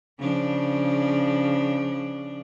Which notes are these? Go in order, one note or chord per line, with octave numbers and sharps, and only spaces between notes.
C#3 F3 D4